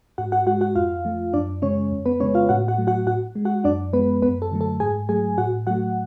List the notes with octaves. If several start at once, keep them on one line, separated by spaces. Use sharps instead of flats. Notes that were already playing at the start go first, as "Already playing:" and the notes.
G#2 F#4 F#5
F#4 F#5
G#3 F#4 F#5
F#4 F#5
F2 F4 F5
F3 A3
F#2 D4 D5
C#3 G#3 C#4 C#5
F2
B3 B4
C#3 G#3 C#4 C#5
F4 F5
A2 F#4 F#5
F#4 F#5
F#3 A3
F#4 F#5
A2 F#4 F#5
G#3
F#4 F#5
F#2 D4 D5
F3 G#3 B3 B4
F#2 B3 B4
A4
D3 F#3 A3
A4
G#2 G#4 G#5
F#3 A3 G#4 G#5
A2 F#4 F#5
F#3 A3 F#4 F#5